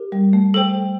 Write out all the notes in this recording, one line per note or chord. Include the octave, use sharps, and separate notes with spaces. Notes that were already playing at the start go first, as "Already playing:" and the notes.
Already playing: G4 A#4
G3
A3
A4 C5 G5